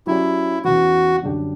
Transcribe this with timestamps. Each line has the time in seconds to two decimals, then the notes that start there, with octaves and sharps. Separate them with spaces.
0.07 F#3 C#4 E4 G4 D5
0.64 E2 C#3 E3 F#4
1.22 F#2 D3 G3 D4 G4